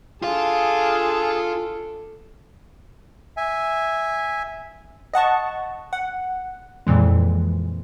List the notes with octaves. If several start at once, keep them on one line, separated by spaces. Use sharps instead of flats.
D4 F4 G#4 A4 F5
E5 G#5
D#5 F#5 A5 C#6
F#5
F2 A#2 E3 G#3